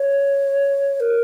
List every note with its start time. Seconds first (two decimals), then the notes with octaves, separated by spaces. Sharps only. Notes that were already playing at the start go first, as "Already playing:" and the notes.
Already playing: C#5
1.00 A#4